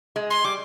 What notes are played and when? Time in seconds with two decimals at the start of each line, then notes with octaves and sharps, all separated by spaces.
0.16 G#3
0.30 C6
0.44 G3 D6